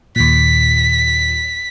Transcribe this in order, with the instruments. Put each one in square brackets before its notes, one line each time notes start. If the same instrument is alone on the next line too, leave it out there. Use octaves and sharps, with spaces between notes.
[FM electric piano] D#2 A#2 [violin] B6